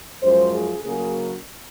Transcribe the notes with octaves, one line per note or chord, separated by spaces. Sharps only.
F#2 F3 G#3 C5
G#4
C#3 F#3 A#3 G#4